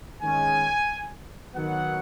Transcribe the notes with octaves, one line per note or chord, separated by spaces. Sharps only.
D#3 G#3 C#4 G#5
D#3 F#3 B3 F#5